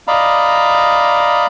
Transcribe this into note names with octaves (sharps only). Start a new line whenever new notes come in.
D5 D#5 F5 A#5 B5